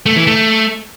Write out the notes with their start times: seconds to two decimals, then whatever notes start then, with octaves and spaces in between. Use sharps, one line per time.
0.06 A3
0.16 E3
0.27 A3